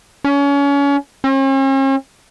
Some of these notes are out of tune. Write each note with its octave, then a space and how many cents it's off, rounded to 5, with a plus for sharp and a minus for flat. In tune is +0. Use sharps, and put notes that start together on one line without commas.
C#4 +30
C#4 -45